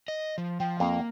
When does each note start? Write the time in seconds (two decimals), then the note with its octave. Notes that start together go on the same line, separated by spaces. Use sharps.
0.08 D#5
0.38 F3
0.60 F3 G5
0.80 F2 A#3